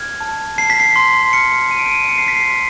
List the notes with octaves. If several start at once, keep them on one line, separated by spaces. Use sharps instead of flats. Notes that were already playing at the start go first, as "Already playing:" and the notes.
Already playing: F6 G#6
A5
A5 C7
B6
C7
C6
F6 C#7
A5 D#7
D7
D#7
A5 C#7
C7
B6
C7
C6